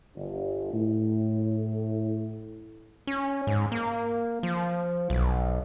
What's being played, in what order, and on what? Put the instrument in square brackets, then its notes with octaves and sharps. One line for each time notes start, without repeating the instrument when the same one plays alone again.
[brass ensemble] G1
A2
[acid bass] C#4
G#2
A#3
F3
B1